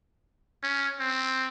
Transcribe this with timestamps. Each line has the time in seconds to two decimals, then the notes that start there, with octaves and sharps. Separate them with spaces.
0.63 C#4
1.00 C4